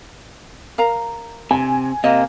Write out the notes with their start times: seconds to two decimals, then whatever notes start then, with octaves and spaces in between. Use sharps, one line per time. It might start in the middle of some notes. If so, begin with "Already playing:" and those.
0.78 A#4 F5 A#5
1.51 C3 G#5
2.04 C3 A#3 D#5